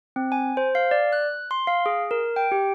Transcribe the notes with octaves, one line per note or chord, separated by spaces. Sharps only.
C4
G#5
C5
F5
D5
F#6
C6
F5
G#4
A#4
G5
G4